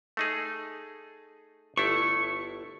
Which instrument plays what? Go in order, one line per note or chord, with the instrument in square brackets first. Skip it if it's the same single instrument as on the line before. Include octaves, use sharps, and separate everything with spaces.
[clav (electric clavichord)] A3 D#4 G#4
[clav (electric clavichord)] G1 A3 E4 [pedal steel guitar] C#6